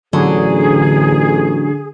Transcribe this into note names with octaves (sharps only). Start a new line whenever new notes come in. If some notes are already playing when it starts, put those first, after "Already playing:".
A1 D3 F#3 G#4